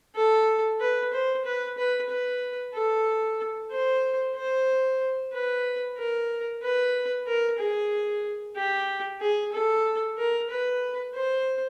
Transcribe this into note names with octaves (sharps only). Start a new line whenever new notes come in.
A4
B4
C5
B4
B4
B4
A4
C5
C5
B4
A#4
B4
A#4
G#4
G4
G#4
A4
A#4
B4
C5